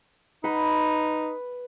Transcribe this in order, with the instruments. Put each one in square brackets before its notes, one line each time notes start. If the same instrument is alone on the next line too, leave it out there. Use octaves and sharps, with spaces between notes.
[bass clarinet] D#4 [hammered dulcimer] B4